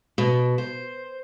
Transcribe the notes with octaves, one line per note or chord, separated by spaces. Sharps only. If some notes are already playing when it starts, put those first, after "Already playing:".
B2
C5